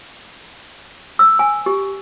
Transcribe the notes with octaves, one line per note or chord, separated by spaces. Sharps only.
E6
G#5
G4